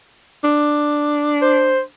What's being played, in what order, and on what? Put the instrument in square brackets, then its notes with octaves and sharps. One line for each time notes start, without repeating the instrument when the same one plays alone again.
[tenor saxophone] D4
[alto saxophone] C5